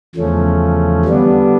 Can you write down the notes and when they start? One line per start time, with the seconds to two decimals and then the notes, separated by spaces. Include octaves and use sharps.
0.15 E2 C#3 F3 A3 C#4
1.05 D3 G3 B3 D4